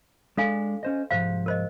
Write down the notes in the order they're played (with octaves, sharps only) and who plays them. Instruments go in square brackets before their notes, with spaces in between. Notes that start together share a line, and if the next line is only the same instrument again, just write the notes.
[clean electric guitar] G#3 D4 D5 [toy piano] A4 F5 G#5
[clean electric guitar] C#4 C5 D#5
[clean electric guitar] C2 G#2 F3 [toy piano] C5 F5
[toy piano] A#4 C5 D#5